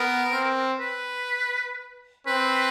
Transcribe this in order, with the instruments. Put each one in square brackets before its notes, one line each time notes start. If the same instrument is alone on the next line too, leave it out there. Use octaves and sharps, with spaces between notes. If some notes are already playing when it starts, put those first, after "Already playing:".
Already playing: [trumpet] B3 [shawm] A#4
[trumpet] C4
[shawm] B4
[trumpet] C4 [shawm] B4